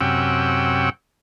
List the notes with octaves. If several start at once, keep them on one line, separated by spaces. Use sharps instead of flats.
F#2 C3 C#4 F#5 G5 E6